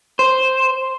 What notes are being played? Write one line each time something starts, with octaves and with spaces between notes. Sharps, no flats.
C5